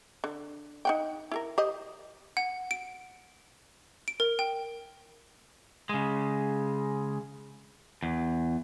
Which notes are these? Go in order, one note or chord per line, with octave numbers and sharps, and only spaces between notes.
D3
D#4 F#5 G5
E4 G#4 A#4
G4 C5 D#5
F#5
D7
D7
A#4
G5
C#3 G#3
E2